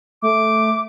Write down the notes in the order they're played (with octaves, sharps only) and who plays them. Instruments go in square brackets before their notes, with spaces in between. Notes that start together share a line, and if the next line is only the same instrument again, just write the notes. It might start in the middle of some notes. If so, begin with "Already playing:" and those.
[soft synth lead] A3 [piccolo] D6